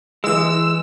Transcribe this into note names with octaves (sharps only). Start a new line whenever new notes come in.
E3 G#3 E6